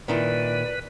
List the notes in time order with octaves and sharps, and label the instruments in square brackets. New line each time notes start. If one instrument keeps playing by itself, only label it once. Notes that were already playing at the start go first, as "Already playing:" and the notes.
[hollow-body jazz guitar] A#2 D#3 E4 [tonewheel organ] B4 [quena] D5